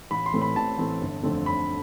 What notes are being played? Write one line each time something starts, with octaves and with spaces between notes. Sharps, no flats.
A1 B5
C6
A2 E3 A3 C4
B5
A1 A5
A2 E3 A3 C4
G1
F2 D3 A3 C4
G1 B5